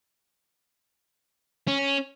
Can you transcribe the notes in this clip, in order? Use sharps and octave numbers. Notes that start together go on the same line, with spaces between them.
C#4